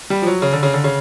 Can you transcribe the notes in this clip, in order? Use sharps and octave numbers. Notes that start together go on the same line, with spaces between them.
G3
F3
F#3
C#3
D3
C#3
D3
C#3